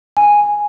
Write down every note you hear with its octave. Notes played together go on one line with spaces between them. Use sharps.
G#5